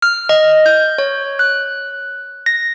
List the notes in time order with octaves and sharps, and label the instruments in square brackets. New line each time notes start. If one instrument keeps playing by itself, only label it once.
[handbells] F6
D#5
G6
C#5
F#6
A#6